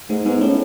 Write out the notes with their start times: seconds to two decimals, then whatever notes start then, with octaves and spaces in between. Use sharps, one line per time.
0.09 G#2 A3
0.25 G#2 B3
0.41 A2 C#4